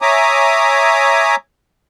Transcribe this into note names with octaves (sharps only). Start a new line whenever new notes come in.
C#5 E5 G#5 A#5 D6 D#6